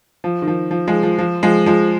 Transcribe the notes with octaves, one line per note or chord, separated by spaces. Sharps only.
F3
D#3
F3
F3
F3 G#3
F3
F3
F3 G#3
F3 G#3